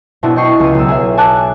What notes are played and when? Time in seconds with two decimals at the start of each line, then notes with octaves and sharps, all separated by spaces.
0.23 B2 B3 C4 D4 E4
0.36 D#5 G5 C#6 C7
0.60 C#2 D#7
0.75 B1 E6
0.89 G#4 E5
1.17 G#5 A5 D6 F#6